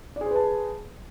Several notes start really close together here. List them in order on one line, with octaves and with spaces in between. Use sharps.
D5 G#4 C5 B4 A5